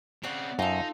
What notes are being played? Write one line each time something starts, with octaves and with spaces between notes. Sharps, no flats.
C#3 C4 C#5 D5 F#5
F#2 D#4 F4 A4